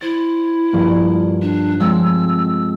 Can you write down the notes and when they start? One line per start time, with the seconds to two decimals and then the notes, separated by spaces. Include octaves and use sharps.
0.01 E4 C5 A6
0.73 G2 F3 A#3
1.42 D4
1.80 F3 G#3 C4 E6